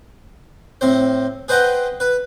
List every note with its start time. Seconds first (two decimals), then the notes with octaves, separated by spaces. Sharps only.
0.81 A2 C4 C5
1.48 G#4 B4 C5 D#5 F#5 G5
2.00 B4